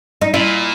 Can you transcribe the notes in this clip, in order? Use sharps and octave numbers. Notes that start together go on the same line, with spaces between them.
D#4
A#2 E4